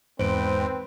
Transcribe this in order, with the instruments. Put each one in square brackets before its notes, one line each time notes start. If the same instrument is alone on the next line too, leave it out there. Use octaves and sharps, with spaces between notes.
[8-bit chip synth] E2 G#2 [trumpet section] C4 B4 [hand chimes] C5 D7